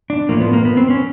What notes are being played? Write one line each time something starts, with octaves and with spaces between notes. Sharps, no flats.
D4
A2 F3 A3 A#3
B3
A#3
B3
C4
C#4